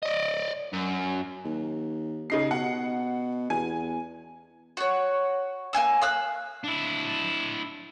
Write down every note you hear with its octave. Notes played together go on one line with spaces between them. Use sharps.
D5 D#5
F#2
D#2
C#3 D#4 C7
B2 F#5
E2 G#5
F#4 C#5
A#3 F#4 G#5 E6
F5 E6 F#6
D4 E4